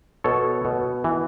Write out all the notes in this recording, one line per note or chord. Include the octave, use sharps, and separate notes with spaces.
B2 A4 C#5
B2
E3